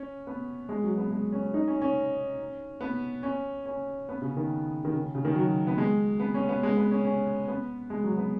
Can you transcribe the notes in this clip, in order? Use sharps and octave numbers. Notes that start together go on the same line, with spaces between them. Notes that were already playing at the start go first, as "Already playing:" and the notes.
Already playing: C#4
B3
G#3
F#3
B3
G#3
C#4
D#4
C#4
C#4
B3
C#4
C#4
B3
C#3
D#3
D#3
C#3
C#3
D#3
F#3
B3
G#3
B3
C#4
B3
G#3
B3
C#4
C#4
B3
G#3
F#3
B3